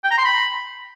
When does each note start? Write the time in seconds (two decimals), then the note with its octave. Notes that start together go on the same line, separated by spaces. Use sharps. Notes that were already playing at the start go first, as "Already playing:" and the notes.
0.04 G5
0.11 A#5
0.18 C6
0.25 B5